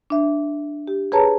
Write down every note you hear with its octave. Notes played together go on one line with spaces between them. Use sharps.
D4 E5
G4
G#4 B4 C#5 A5 A#5